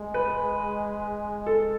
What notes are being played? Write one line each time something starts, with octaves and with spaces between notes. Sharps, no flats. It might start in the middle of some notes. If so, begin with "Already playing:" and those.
Already playing: G#3
B4
A4